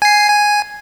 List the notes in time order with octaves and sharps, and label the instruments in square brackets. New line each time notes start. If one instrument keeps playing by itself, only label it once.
[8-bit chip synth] G#5 C7
G#5